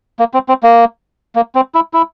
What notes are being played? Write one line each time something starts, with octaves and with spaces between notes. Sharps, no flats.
A#3
C4
C4
A#3
A#3
C4
E4
E4